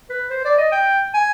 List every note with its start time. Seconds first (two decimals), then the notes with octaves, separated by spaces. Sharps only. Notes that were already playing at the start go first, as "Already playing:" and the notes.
0.10 B4
0.30 C5
0.45 D5
0.58 D#5
0.72 G5
1.14 G#5